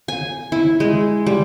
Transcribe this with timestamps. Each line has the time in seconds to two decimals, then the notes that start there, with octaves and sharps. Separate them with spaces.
0.08 G#5
0.52 E4
0.80 G#3
1.26 G3